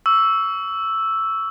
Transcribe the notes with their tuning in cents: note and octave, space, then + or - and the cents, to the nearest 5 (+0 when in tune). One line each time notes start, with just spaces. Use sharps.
C#6 +30 E6 +0